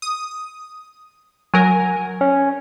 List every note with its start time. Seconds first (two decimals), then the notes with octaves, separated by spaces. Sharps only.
0.02 D#6
1.54 F#3 A#4 G#5
2.21 C#4